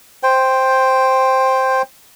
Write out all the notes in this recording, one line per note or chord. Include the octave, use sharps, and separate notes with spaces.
C5 G5